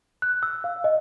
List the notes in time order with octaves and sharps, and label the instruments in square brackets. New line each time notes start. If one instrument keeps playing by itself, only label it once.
[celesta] F#6
E6
F5
D#5